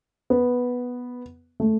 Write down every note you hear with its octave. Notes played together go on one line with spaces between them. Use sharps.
B3
A3